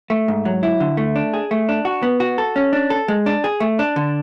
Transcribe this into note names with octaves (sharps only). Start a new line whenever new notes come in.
A3
G#2
F#3
E4
D3
A3
D4
G#4
A3
D4
F#4
B3
F#4
A4
C#4
D4
A4
G#3
D4
G#4
A3
D4
D3